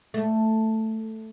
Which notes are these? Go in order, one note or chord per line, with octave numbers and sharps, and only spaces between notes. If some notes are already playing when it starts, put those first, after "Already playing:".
A3